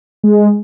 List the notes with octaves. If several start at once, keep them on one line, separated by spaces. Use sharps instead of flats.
G#3